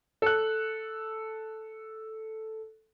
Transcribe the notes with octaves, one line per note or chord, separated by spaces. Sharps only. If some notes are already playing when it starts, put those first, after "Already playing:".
A4 F#6